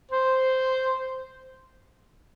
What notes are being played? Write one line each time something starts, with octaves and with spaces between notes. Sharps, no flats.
C5